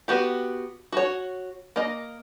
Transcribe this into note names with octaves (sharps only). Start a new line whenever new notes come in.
B3 F#4 G4
F#4 C#5
A#3 D#5